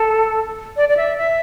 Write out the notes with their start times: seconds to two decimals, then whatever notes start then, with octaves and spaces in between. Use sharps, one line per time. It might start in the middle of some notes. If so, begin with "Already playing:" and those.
Already playing: A4
0.77 D5
0.89 D5
0.97 E5
1.18 E5